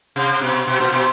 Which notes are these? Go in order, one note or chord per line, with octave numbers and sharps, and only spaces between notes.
C3
B2
B2
A#2
B2